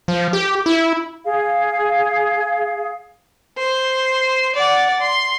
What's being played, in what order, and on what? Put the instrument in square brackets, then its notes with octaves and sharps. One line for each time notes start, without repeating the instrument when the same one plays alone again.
[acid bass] F3
G4
E4
[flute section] G#4 F5
[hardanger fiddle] C5
D5 F#5
C6